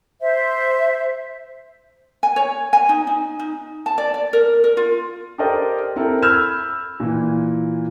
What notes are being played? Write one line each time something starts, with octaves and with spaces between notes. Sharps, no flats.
C5 E5
G#5
C#5
G#5
D#4
D#4
D#4
A5
D5
D5
A#4
A#4
F4
G4 A4 A#4 C5 D5 D#5
C4 E4 A4 A#4
B5 E6 F6 G6 G#6 E7
A#2 E3